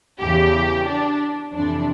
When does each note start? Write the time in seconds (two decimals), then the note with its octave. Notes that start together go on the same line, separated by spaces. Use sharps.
0.20 E2 C#3 E3 G4
0.87 D4
1.54 F2 C3 E3 D4